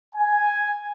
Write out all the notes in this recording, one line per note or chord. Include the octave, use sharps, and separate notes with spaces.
G#5